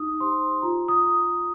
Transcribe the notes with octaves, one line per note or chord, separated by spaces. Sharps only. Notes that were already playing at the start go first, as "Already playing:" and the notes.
Already playing: D#4 D#6
G4 C5 C6
F4 A#5
D#6